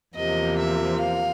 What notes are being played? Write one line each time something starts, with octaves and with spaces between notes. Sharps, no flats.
E2 C3 F3 A#3 D#5
E5
F5